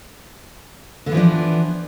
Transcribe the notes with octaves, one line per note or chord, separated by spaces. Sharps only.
D3 E3 F3 B3 D4